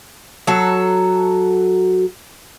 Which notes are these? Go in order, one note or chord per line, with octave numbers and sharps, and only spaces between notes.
F#3 F#4 A4